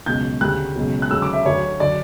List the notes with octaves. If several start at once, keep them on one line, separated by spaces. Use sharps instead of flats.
C#2 B2 F#3 G6
D2 C#3 G3 F#6
C#2 B2 F#3
F#6
D2 C#3 F#3 E6
D6
E5
D2 D3 F#3 C#5
D3 F#3 D5